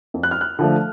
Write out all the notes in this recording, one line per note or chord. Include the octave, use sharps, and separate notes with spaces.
F2
F#6
F6
F#6
D3 F3 A3